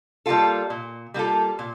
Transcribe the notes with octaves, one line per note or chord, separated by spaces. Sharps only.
G3 A#3 F4 A4
A#2
G3 A#3 F4 A4
A#2